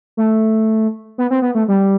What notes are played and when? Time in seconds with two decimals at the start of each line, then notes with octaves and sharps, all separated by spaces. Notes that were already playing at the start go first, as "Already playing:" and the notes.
0.17 A3
1.18 B3
1.30 C4
1.42 B3
1.55 A3
1.68 G3